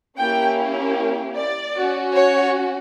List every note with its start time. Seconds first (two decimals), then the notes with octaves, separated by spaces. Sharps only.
0.18 A#3 C#4 E4 G4 G5
1.36 D5
1.75 C#4 F#4
2.15 C#5